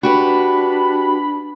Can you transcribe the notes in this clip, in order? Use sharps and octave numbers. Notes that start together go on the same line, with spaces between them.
D4 F#4 G4 B4 B5